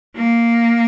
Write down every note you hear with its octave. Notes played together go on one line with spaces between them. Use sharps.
A#3